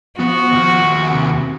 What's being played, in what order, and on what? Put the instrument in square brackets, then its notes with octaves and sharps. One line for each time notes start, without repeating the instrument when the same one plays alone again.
[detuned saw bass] F3 [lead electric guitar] B3 [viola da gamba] F#4
[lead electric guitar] D#2 F#5
[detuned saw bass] C3